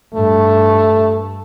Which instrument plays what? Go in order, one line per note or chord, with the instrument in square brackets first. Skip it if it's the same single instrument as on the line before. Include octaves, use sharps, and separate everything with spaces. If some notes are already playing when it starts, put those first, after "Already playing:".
[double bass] G2 [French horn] A3